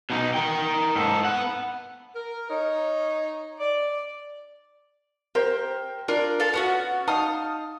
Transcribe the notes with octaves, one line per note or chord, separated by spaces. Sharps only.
B2 D#4
A#4 G5
G#2 A4
B3 F#5
A#4
D#4 C#5
D5
G4 A#4 C5
D4 F4 A#4 D5
A4 F5 A5
B3 C#4 F#4 C#7
D#4 F5 A5 D#6